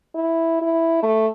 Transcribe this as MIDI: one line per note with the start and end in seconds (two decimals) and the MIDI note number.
0.15 0.59 64
0.62 1.01 64
1.02 1.27 57